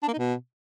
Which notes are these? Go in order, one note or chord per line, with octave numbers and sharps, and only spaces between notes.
D4
A#3
D#4
B2